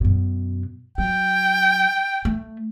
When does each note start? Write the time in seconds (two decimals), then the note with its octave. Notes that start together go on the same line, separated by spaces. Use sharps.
0.01 F#2 B2
0.98 F#3 G5
2.25 A3